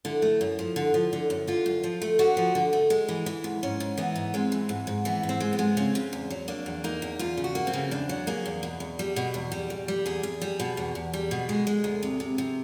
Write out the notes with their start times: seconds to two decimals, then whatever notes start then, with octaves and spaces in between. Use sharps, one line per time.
0.05 D3 E4
0.22 A3
0.41 F#2
0.59 F3
0.76 D3
0.94 F3
1.13 D3
1.30 F#2
1.47 D3 F4
1.66 F#2
1.84 F3
2.02 A3
2.19 D3 F#4
2.37 F3
2.55 D3
2.73 A3
2.90 G#3
3.09 E3
3.26 E3
3.44 G#2
3.63 G#2 C#4
3.80 G#2
3.98 E3 B3
4.16 G#2
4.34 G#3 C4
4.52 E3
4.69 G#2
4.87 G#2
5.05 E3 B3
5.23 G#2
5.29 C4
5.40 G#3
5.53 B3
5.59 G#3
5.77 C#3 C4
5.95 C#3
6.13 E2
6.30 F#3
6.48 A#3 D4
6.66 E2
6.84 A#3 D#4
7.02 E2
7.19 E2 F4
7.37 C#3
7.44 F#4
7.55 A#3
7.67 C4
7.73 C#3
7.91 E2 D4
8.09 F#3
8.27 A#3 G#4
8.46 E2
8.63 B2
8.80 E2
8.99 G3
9.16 B2
9.34 E2
9.52 G3
9.70 E2
9.88 G3
10.06 E2 G#4
10.23 E2
10.42 G3
10.60 B2
10.77 E2
10.95 E2
11.13 G3
11.31 B2
11.49 G#3 G#4
11.67 G#3
11.84 D2
12.03 C3
12.20 C3
12.38 C3